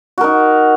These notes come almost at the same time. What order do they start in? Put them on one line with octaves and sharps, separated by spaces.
F#4 A#4 D#4